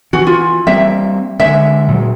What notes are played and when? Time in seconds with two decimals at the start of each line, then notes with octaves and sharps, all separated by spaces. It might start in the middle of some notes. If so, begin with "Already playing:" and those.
0.13 E3 F#4
0.27 F4
0.67 G3 A#3 C4 E5
1.40 D3 G#3 E5
1.88 A#2 F#3